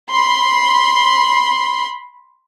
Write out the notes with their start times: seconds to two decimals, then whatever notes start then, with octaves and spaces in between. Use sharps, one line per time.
0.11 B5 C6